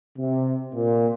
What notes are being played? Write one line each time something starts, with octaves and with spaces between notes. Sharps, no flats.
C3
A#2